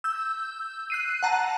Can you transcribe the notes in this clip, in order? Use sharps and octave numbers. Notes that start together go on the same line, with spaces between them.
E6 G6
F#6 C7 D#7
F#5 A5 A#5